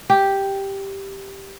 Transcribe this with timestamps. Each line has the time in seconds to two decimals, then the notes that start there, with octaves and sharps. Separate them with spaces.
0.10 G4